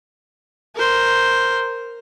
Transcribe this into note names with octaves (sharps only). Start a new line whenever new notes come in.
A#4 C5